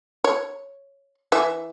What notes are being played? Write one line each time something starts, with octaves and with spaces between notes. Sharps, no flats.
C#5
E3 E5